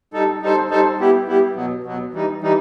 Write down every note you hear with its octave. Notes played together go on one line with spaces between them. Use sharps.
G3 D#4 A4
G3 D#4 A4 C5
G3 D#4 A4 C5
G3 B3 E4 G4
G3 B3 E4 G4
B2 F#3 B3
B2 F#3 B3
E3 G3 D#4
E3 G3 D#4